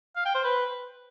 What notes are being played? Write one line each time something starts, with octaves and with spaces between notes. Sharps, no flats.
F5
G5
C5
B4